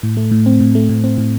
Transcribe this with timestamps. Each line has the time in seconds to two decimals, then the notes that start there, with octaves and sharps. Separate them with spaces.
0.03 A2
0.17 A3
0.31 A2
0.46 C4
0.60 A2
0.75 A3
0.89 A2
1.04 C4
1.18 A2